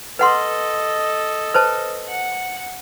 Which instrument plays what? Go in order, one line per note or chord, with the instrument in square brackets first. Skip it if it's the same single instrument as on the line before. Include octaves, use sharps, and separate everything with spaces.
[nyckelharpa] A4 D#5 [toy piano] B4 F#5 C6
[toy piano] B4 C5 A5
[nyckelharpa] F#5